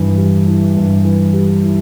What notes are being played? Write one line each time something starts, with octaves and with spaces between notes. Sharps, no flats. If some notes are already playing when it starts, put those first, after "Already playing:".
Already playing: G2 E3 E4
G3
E4
G2
E3
G3
E4